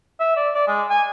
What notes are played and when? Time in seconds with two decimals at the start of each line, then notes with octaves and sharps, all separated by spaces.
0.20 E5
0.36 D5
0.54 D5
0.67 G#3
0.90 G#5